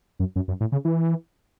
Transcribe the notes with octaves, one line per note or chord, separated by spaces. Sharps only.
F#2
F#2
F#2
A2
C#3
E3